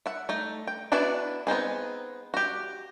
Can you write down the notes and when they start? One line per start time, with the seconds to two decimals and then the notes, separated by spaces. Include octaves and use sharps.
0.06 E5 F#5
0.29 A3 D#4
0.67 G5
0.92 B3 D4 E4 F#4 B4
1.47 B3 C4 D#4 G#4
2.34 F#4 G4